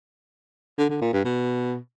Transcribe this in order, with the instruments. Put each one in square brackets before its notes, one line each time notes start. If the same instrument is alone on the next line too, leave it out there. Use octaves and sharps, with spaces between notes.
[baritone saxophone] D3
D3
A#2
G2
B2